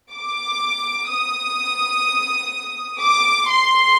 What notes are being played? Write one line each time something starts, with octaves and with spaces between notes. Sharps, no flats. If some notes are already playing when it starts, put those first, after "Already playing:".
D6
D#6
D6
C6